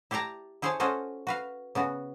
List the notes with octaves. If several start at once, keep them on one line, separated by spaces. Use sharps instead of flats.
E4 G4 D5 A5 A#5
E4 G#4 C5 C#5 G#5 A5
C#4 F4 F#4 A4 C5 D#5
F#4 B4 F5
C#3 B3 F#4